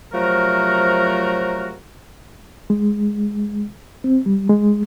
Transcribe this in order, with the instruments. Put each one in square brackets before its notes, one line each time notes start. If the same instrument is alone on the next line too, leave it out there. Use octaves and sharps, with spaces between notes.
[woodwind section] C3 F3 F#3 A3 F#4 A#4
[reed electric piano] G#3
C4
G3
G#3